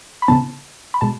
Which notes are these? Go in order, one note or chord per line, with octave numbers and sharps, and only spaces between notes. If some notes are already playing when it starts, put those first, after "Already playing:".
B5
C#3 E3 B3 A5
B5
B2 G#3 A5